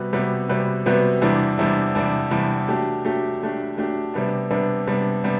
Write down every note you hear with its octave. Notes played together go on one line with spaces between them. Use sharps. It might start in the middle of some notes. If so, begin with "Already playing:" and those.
Already playing: C3 G3 B3 F#4 B4
C3 G3 B3 F#4 B4
C3 G3 B3 F#4 B4
C3 G3 B3 F#4 B4
E2 C3 G3 D4
E2 C3 G3 D4
E2 C3 G3 D4
E2 C3 G3 D4
F#3 A3 D4 G4
F#3 A3 D4 G4
F#3 A3 D4 G4
F#3 A3 D4 G4
C3 G3 B3 D4
C3 G3 B3 D4
C3 G3 B3 D4
C3 G3 B3 D4